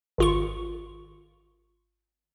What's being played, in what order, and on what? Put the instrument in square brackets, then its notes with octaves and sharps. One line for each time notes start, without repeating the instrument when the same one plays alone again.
[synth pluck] G#1 F4 C#6